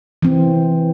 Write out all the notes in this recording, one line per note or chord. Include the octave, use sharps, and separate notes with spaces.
E3 C4